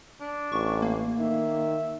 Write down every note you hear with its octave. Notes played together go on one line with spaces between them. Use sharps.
D4
A1 C#6
A#3
D#3 E5